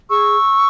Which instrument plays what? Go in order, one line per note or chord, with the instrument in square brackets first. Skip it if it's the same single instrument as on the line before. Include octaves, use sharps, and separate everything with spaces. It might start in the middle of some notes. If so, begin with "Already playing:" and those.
[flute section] G#4 C#6 E6